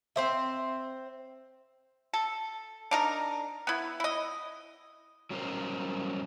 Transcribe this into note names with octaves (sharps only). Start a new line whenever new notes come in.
C4 C5 E5
A4
D4 D#4 A#4
B3 E4
E4 D#5
F#3 G3 C#4 A#4 C5